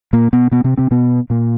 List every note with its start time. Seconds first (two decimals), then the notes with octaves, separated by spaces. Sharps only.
0.13 A#2 A#3
0.33 B2 B3
0.51 B2 B3
0.64 C3 C4
0.77 C3 C4
0.91 B2 B3
1.30 A#2 A#3